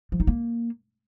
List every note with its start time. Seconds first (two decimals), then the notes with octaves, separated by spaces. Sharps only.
0.12 F3
0.20 D#4
0.27 A#3